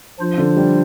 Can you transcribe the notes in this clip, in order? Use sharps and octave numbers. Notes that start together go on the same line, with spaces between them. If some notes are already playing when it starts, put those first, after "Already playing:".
F3 D4 F4 C5
D3
G3